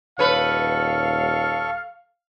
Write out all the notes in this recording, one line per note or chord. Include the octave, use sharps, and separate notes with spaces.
D#1 A4 B4 C#5 F5 C#6